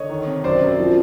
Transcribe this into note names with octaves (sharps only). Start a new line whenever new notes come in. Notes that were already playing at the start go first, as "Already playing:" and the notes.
Already playing: D3 C#5 D#5
D#3
C3
F#2 C5 D5
F#2
F3